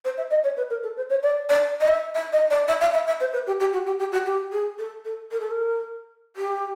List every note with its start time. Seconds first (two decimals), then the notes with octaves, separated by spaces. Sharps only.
0.05 C5
0.18 E5
0.31 D#5
0.44 C#5
0.57 B4
0.70 A#4
0.83 A4
0.97 C5
1.10 C#5
1.23 D5
1.49 D5
1.81 D#5
1.89 E5
2.15 E5
2.33 D#5
2.51 D5
2.68 E5
2.81 F5
2.94 E5
3.07 E5
3.20 C5
3.33 B4
3.47 G4
3.60 G4
3.73 F#4
3.87 G4
3.99 G4
4.12 F#4
4.26 G4
4.52 G#4
4.79 A4
5.05 A4
5.31 A#4
5.40 A4
5.51 A#4
6.36 G4